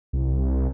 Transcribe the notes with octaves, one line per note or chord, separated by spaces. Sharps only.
C2